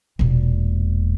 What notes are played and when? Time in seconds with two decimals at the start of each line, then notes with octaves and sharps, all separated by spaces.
0.19 E1 A#2